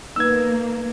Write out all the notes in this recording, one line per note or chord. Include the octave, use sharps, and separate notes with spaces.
A#3 B3 D#4 E6 G#6